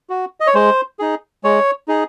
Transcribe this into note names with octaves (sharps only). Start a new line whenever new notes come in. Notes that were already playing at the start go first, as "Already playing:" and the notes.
F#4
D#5
C#5
G#3 C5
D#4 G#4
G#3 C#5
D#4 G#4